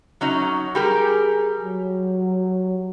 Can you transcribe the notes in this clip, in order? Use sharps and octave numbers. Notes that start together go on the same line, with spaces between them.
F#3 C#4 D#4
G3 G4 G#4 A#4
F#3